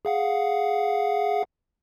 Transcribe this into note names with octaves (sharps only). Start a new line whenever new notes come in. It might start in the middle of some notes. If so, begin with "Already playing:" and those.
G#4 F5 F#5